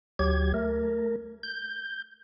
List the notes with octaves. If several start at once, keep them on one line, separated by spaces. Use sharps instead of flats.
D2 F#3 G4 G#6
A3 A#4
G6